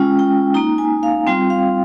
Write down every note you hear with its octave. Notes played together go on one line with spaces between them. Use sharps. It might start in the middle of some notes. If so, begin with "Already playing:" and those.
Already playing: G#3 C#4 F4 G5
G5
A#3 D#4 A#5
G#5
F5
G3 C4 F4 G5
F5